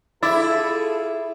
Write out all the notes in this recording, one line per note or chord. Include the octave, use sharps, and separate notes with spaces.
E4 F4 G#4 A4 D6 E6 A6